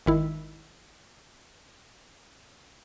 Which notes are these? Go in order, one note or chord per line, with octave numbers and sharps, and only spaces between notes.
G#1 D#3 E4